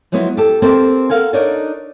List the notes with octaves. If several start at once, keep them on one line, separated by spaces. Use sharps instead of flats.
F3 F#3 G#3 B3 E4
G4 A4
A#3 C4 G4 A4 C5
A4 A#4 F5 F#5 G#5
D4 D#4 A4 A#4 C#5 D5